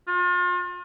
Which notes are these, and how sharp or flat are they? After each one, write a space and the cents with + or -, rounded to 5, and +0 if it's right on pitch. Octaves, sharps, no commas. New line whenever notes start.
F4 +40